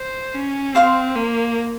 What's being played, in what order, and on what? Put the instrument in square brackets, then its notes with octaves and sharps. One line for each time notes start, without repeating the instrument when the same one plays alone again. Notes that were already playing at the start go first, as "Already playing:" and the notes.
Already playing: [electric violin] C5
C#4
[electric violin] C4 [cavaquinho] C5 F5 C6
[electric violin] A#3